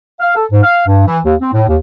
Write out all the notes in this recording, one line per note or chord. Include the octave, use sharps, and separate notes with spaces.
F5
A4
G#2
F5
G2
E3
D#2
C4
A2
D#2